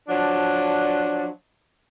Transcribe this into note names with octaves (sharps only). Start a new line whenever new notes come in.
F3 F#3 D4